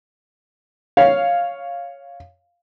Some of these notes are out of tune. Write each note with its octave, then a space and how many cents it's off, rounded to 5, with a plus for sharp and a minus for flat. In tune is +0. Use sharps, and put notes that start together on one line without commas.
C#5 +0 F5 +0